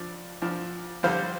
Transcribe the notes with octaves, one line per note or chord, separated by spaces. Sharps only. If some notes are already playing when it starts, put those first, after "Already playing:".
Already playing: F2 F3 D4 D5
F2 F3 D4
F2 D3 G3 C5 F5